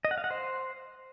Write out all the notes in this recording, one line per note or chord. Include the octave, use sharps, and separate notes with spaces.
D#5
F#5
F5
F#5
C5